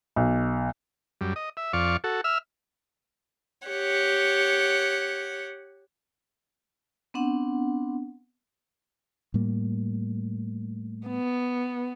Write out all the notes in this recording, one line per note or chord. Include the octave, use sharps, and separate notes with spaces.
B1
F#2 G3
D#5
E5
F2 D5 F5 C#6
F#4 A4
E5 E6 F6
G4 C#5 F#5
B3 C4 D4 F#5
A2 G3 A#3
B3